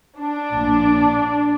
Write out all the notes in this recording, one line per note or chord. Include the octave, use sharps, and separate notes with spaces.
D4
A#1 A#2